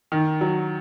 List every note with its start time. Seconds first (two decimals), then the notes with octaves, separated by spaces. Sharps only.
0.12 D#3
0.41 F#3